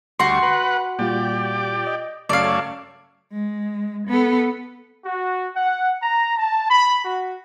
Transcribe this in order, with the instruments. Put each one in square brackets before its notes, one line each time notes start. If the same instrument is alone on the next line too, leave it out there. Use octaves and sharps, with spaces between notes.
[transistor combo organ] D2 G3 C#6 [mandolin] F#4 C6
[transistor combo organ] B4 F#5
[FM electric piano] A#2 G3 F4 [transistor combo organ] G4 D5
[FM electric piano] D#5
[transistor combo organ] F#2 A3 C#5 [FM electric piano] C#3 [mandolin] D5 F5
[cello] G#3
B3 A4
[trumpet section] F#4
F#5
A#5
A5
B5
F#4